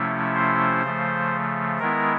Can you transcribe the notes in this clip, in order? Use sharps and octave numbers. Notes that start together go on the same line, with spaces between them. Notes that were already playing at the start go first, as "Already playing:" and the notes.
Already playing: C3 F3 A3 C#4 E4
C5
C#3 F3 A3
D#3 G#3 B3 E4 A#4